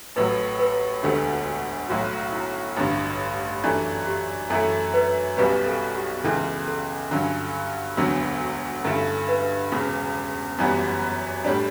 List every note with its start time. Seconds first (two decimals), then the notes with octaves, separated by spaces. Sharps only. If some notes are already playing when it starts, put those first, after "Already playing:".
0.16 A1 A2 F#3 B4
0.59 B4
1.03 E1 D2 D3 A3 G4
1.89 B1 A2 F#3 F#4
2.33 E4
2.77 A1 G2 D3
3.64 F#2 E3 A3 D4 G4
4.07 G4
4.50 F#2 E3 A3 E4 A4
4.94 B4
5.37 B1 B2 G3 C#4 B4
5.66 A4
5.95 G4
6.24 C#2 C#3 E3 A4
6.68 A4
7.11 G2 D3 F#3 C#4
7.97 E1 D2 D3 F#3 B3
8.85 G2 D3 A3 C#4 E4 A4
9.28 B4
9.72 E1 E2 C#3
10.58 G1 F#2 E3 G3 B3
11.45 A2 G3 D4 C#5